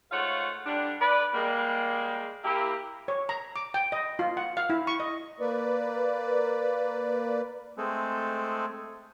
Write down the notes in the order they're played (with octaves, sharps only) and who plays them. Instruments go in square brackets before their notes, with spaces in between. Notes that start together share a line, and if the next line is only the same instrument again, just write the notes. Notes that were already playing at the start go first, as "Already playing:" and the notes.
[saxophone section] G#2 A3 F4 C#5 F5 F#5
D3 G3 D4
B4 D5
G3 G#3 A#3
A#3 E4 G4
[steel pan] C#5
A#5
D6
G5
D#5
F4
F#5
F5
E4
C#6
D#5
[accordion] A#3 B4 D5
[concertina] G#3 A3 C4 G#4 A4